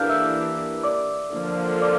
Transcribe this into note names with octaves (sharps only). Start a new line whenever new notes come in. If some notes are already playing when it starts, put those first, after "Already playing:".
Already playing: E3 A#3 D4 G4 A4 F5 F6 G6
E5 E6
D5 D6
D3 F3 A#3 F4
D5 D6